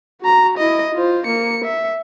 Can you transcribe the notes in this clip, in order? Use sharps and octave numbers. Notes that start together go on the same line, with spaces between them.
F#4 A#5
E4 D#5
F4 C5
A#3 C#7
E5